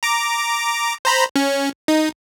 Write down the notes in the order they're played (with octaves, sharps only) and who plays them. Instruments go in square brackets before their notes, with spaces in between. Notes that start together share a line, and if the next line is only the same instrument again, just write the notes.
[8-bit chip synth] A#5 D6
C5 A#5 B5
C#4
D#4